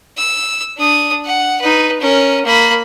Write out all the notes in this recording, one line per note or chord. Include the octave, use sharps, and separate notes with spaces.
E6
D4 D#6
F#5
D#4 B4
C#4 A#4
A#3 B5